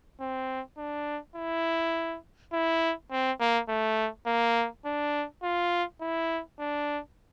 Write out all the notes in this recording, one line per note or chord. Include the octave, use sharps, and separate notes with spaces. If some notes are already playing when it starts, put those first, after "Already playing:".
C4
D4
E4
E4
C4
A#3
A3
A#3
D4
F4
E4
D4